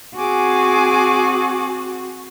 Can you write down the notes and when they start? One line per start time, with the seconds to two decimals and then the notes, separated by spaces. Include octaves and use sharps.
0.17 C4 F#4 G#4 G#5 D6